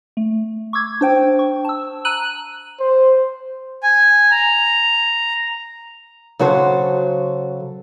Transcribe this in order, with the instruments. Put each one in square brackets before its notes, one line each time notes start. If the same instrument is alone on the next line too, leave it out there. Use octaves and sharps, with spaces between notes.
[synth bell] A3
C#6 D6 E6 G#6
D4 C5 G5
C#6
A5 E6
A#5 E6 F#6 D#7 F#7
[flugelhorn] C5
[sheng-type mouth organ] G#5
A#5
[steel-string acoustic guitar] C#3 F#3 F#4 A4 C5